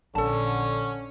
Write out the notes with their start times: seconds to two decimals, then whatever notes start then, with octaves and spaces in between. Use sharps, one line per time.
0.15 A#1 D3 C#4 A4 A5